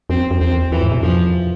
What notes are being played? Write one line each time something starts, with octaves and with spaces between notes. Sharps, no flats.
F2 C4
F2
E2 C4
E2 E3
G#2
B2
F2 F3